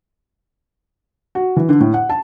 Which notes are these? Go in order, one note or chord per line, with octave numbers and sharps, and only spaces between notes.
F#4
E3
D3
A2
F#5
A5